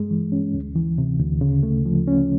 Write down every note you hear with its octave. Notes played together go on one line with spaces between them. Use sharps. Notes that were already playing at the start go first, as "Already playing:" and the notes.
Already playing: G2 G#3
E3
C#4
D2
E3
C3
D2
C#3
A3
F3
C#4